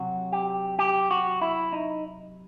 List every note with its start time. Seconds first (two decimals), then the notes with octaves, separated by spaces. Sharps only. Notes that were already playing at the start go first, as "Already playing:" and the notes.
Already playing: C3 F#3 F#4
0.33 G4
0.79 G4
1.11 F#4
1.42 E4
1.73 D#4